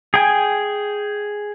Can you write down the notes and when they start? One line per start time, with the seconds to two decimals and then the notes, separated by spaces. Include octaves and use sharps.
0.14 G#4 G5 G#5